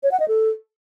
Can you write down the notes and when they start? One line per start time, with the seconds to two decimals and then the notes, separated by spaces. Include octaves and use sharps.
0.03 C#5
0.11 F#5
0.20 D#5
0.28 A4